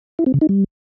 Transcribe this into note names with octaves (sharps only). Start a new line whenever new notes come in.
E4
C4
C#3
D#4
G3